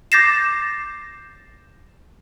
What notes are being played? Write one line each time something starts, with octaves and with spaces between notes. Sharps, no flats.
D6 G6 A6 A#6 C7 E7